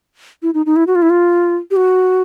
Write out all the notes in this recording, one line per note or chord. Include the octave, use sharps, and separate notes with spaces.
E4
D#4
D#4
E4
F#4
F4
E4
F4
G4
F#4